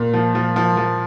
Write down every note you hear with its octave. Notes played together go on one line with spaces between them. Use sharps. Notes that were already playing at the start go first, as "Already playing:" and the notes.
Already playing: A#2
F3
F3
F3
F3